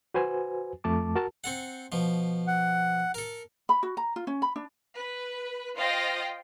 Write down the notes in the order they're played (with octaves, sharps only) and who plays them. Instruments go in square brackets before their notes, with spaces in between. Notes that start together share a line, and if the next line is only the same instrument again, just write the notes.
[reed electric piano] F#4 B4 C5 G#5
F2 A3 A5 D6
F#4 A#4 A5
[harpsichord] C4 A4 F#5
B2 F3
[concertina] F#5
[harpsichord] A4 A#4
[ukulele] B5
F#4
A#5
F4
C#4
B5
D4
[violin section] B4
F4 C5 D#5 F5 G5 A#6